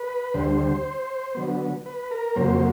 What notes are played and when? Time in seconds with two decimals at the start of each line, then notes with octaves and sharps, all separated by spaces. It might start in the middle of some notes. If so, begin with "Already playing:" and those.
Already playing: B4
0.34 D2 D3 G3 C5
1.35 D3 F#3 B3
1.86 B4
2.11 A#4
2.36 F2 C#3 F#3 A#3 C5